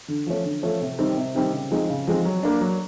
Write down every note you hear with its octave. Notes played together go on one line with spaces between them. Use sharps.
D3
F3 A3 C#4
D3
F3 A3 C#4
C3
D#3 G3 C4 D#4
C3
D#3 G3 C4 D#4
C#3
F3 G#3 C4 D#4
C#3
F3 G#3 C4 D#4
F#3
A#3 D4
F#3